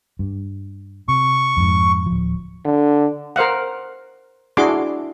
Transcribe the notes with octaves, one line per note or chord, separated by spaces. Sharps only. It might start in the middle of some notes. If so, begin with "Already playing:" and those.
G2
C3 C#6
F2 G#2
D1 F3
D3
A#4 C5 F5 F#5
D4 E4 F#4 G#4 C6 D6